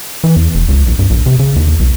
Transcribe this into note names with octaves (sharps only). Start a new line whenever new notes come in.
E3
E2
E1
C#2
A#1
G2
A#1
C3
C#3
D#2
B1